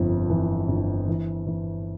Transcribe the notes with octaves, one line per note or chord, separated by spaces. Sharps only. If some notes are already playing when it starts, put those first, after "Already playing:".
Already playing: G1 F2
E3
G1
E3
E3